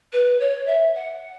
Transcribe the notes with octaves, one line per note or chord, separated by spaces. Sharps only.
B4
C#5
E5
F#5